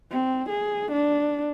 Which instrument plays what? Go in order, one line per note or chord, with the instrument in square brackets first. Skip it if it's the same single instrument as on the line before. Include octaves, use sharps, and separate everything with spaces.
[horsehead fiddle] C4
G#4
D4